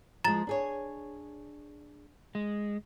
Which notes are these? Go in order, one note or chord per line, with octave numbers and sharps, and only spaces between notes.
F3 G#3 A#5 A6
D4 G#4 C#5
G#3